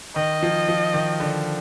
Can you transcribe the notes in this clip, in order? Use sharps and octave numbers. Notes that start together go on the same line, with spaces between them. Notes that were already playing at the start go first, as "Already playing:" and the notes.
D#3 D#5
F3
F3
D#3
D3